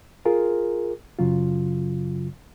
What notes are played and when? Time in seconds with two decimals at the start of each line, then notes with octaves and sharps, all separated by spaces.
0.25 F4 G#4 A#4
1.19 F#2 C#3 F#3 F4